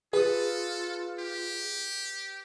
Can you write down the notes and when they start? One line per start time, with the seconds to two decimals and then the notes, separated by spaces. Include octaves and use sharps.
0.13 F4 G#4 A4 B4 D#6
1.19 G4